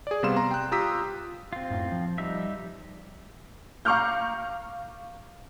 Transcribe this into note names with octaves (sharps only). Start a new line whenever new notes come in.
G#4 D5
C3 G3 B3 F5 C6 E7
A#5 C6
G5 F#6
F4 G4 A#5 D#6 E6 B6
C4 F4
F#2 A2
F3
G3 D#4 E5
F5 A#5 C#6 D6 F6 G6